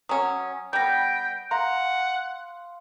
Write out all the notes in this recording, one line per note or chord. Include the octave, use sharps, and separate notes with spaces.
F#3 C#4 D#6
G3 B3 G5 G6 A#6
F5 F#5 A#5 C6